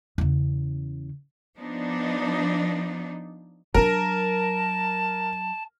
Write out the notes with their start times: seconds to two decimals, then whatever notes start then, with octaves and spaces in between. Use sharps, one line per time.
0.18 E2 C#3
1.58 F3 B3 D4 D#4
3.74 F#3 D4 A#4 A5